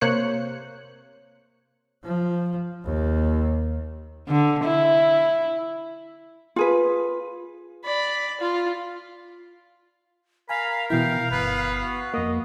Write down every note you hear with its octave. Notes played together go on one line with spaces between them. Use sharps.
C3 A#3 C5 C#5 F#6 C#7
F3
D#2
D3
E4
F4 G#4 B4
D5 B5
F4
A#4 F5 G#5 A#5 B5
B2 E3 E4 F5 G5
G1 B3 B4
F#4
F2 A#3 D#5